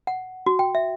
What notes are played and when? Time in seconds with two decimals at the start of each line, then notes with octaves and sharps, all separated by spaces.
0.07 F#5
0.46 F#4
0.59 G5
0.75 E5